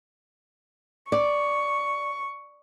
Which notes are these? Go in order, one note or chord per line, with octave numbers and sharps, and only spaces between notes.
D5 C#6